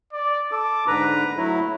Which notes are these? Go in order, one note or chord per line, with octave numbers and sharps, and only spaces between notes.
D5
A4 D6
G#2 D3 B4 A#5
F#3 A3 E4